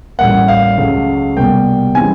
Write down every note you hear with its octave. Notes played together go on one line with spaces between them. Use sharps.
A1 A2 E3 G3 A#3 F#5
F5
C#2 C#3 F#3 A3
C2 B2 G3 A#3 G5
C#3 E3 G3 C4 G#5